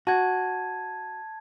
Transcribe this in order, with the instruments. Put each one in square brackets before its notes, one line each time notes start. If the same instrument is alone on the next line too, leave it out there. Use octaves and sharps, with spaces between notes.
[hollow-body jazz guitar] F#4 [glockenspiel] A5 G#6